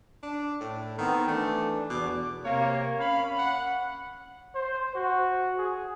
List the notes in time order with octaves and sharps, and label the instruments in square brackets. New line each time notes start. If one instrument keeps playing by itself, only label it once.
[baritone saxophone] D4
A2
[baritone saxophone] D#3 [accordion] B3 C4
[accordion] E3 D4 [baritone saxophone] A3
[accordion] E2 D6 [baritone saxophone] B2
[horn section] C3 A#3 [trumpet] C#5
[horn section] C#4 B5 [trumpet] F5
[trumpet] F#5
[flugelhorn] C5
F#4
G#4